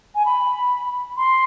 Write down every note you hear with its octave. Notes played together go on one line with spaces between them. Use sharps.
G#5
B5
C6